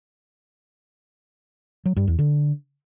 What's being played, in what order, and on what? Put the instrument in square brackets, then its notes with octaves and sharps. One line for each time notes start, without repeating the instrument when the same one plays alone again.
[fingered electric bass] F#3
G2
E2
D3